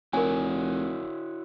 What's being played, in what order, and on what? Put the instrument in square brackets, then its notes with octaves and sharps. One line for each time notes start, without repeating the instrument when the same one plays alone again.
[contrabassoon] F1 [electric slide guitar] E4 F#4 C#5 [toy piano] A#4 G#5